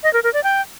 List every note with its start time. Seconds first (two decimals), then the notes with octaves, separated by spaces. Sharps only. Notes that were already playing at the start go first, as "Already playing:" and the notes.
0.03 D#5
0.13 A#4
0.23 A#4
0.33 D5
0.44 G5